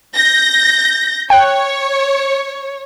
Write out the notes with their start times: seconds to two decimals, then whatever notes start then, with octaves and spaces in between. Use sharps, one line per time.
0.13 G6 A#6
1.30 C#5 G5 F#6